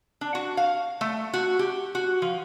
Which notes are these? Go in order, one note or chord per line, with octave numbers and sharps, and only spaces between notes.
D4
F#4
F5
A3
F#4
G4
F#4
F3